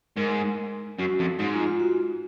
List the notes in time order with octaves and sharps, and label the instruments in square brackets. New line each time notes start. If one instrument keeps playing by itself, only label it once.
[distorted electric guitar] G#2 [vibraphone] A#4
[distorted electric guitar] F#2 [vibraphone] F#4
[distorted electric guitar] F2
[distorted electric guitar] G#2 [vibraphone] D#4
[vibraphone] F4
F4
F#4